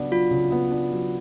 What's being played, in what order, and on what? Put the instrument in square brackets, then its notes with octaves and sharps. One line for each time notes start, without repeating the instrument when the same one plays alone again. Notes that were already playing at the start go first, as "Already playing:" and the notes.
Already playing: [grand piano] C#3 F#3 B3 D4
[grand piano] F#3 [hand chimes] F4
[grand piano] C#3
B3
D4
F#3